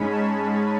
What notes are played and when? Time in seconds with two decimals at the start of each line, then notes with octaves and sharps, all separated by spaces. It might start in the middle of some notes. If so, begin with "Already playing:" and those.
Already playing: G#2 G#3 C#4 B5
0.10 A5